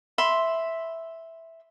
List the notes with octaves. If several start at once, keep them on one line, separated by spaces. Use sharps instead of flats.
E5 B5 C6